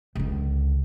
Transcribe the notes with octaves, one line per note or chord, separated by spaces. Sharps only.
C#2 D3